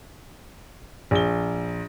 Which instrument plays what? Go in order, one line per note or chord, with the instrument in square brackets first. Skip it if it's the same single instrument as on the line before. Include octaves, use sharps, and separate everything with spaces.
[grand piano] A#1 G7